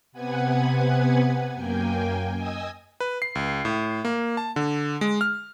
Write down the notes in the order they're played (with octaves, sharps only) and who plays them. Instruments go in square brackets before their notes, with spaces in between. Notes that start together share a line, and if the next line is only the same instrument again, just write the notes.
[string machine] C3 B3 B4 F#5 G#5 G#6
F#2 A#3 G5 G#5
D#5 G#5 D#6 E6
[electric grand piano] B4
C7
C#2
A2
A#3
A5
D3
G#3
F6